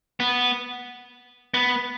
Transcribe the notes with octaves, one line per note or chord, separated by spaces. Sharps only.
B3
B3